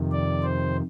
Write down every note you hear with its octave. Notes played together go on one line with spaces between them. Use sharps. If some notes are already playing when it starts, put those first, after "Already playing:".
Already playing: F2 C3 D#3
D5
C5